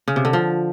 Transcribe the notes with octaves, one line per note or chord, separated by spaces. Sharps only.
C#3
C3
D3
F3